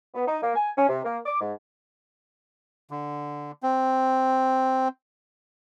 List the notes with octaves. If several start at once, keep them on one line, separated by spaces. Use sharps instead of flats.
B3
D#4
A#3
G#5
C#4
C3
A#3
D6
G#2
D3
C4